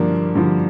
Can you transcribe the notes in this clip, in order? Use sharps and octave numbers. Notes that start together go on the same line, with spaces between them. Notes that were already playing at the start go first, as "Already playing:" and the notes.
Already playing: G2 D3 F3 A#3 D4
G2 D3 F3